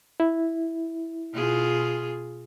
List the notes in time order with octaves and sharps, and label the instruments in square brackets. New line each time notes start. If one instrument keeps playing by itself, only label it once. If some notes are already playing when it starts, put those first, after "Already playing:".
[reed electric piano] E4
[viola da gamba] B2 F4 G#4